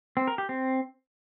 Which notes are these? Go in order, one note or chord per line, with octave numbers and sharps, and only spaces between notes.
C4
A#4
G4
C4